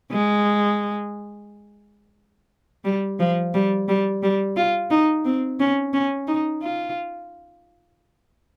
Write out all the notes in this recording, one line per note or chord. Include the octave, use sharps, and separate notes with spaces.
G#3
G3
F3
G3
G3
G3
F4
D#4
C4
C#4
C#4
D#4
F4